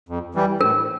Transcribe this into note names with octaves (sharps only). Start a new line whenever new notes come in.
F2
E3 G3
A2 A#4